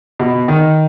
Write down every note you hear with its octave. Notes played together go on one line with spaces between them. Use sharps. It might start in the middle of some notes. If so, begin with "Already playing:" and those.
B2
D#3